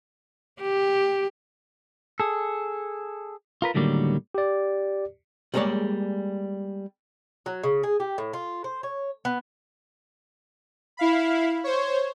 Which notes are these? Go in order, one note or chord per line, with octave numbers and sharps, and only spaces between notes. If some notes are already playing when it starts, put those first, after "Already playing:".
G4
G#4 A4
F4 A#4 B4
A2 D3 D#3 F#3 G3 A#3
G4 D5
G3 G#3 A#3 G#4 C#5 D5
F#3
C#3
G#4
G4
A2
F4
C5
C#5
B3
E4 F5 B5
C5 C#5